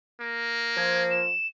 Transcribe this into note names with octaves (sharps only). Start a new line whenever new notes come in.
A#3
F3 G#6
E7